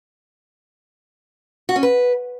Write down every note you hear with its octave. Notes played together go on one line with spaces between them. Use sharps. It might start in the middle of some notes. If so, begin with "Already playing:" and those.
F#4
C#4
B4